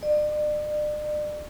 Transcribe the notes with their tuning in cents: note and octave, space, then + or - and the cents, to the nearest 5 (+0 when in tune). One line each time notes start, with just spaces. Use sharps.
D5 +40